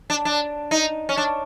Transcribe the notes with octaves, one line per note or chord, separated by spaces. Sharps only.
D4
D4
D#4
C#4
D4